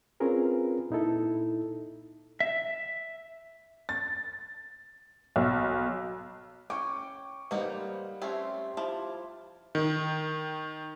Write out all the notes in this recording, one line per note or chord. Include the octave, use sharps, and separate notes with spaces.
C4 C#4 F4 G#4 A#4 B4
A#2 D#4 E4 A4
E5
A6
B1
C#4 G5 C#6 D6
G3 A#3 D#4 B4 C5 F#5
A3 C4 C#4 G4 C#5 E5 C6
F3 E4 A5 D6
D#3